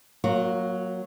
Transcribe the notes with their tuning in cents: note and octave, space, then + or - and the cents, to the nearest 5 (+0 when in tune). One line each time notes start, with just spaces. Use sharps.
F#3 +0 A#3 +0 F4 +45